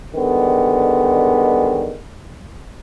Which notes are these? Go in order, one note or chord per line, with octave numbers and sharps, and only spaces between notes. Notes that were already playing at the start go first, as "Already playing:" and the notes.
D3 D#3 G3 G#3 B3